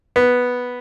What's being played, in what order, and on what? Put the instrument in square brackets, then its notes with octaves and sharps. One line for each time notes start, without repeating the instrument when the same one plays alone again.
[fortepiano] B3